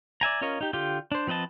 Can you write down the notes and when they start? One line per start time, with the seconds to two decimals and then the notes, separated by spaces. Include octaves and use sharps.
0.21 D5 E5 G#5 A#5
0.41 C#4 F4 A#4 C#5 D#5
0.61 D#4 G4
0.73 D3 F4 G4 G5
1.12 D4 C5
1.27 F3 C4 B4 D#5 A5